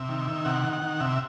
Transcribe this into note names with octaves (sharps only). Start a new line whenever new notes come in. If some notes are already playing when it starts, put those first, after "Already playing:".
Already playing: C3 E5
D#3
D#3
C3 F#5
D#3
F#5
D#3
C3 E5